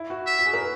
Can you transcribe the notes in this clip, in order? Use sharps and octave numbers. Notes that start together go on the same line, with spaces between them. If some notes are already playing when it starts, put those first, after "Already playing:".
Already playing: E4
F#4
E5
F#4
G#4
A#4
B4